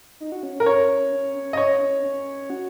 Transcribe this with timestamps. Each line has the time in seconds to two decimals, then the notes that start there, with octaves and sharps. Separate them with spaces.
0.20 D#4
0.32 F#4
0.43 C#4
0.55 C#4
0.60 A#4
0.66 C#4 C#5
1.12 C#4
1.35 C#4
1.53 D#5
1.57 C#4 C#5
1.80 C#4
2.03 C#4
2.50 F#4